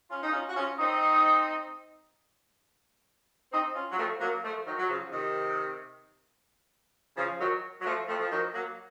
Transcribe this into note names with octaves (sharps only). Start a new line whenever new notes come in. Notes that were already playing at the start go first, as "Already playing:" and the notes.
C#4 F4
D#4
C#4 F4
F#4
C#4 F4
C4 D#4
C4 D#4
C#4 F4
F#3
F3 A3
F#3 A#3
F3 A3
D#3 F#3
F#3
C#3 F3
C3 D#3
C#3 F3
D#3 F#3
F#3
F3 A3
F3 A3
F3
D#3 F#3
F#3 A#3